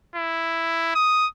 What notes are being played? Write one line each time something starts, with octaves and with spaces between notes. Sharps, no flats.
E4
D#6